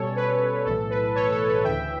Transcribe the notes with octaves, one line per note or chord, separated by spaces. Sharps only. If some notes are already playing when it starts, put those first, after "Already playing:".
Already playing: B2 G3 C#4 A4 C#5
B4
B1 A2 E3 A4
B4
A4 C#5
A4
B4
D2 C#3 E3 E5 G5